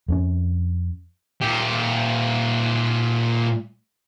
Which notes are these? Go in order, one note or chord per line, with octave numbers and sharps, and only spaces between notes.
F2 B3 C#4
A#2 G4